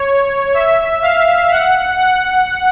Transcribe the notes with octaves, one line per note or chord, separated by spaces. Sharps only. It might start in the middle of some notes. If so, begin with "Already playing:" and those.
Already playing: C#5
E5
F5
F#5
F#5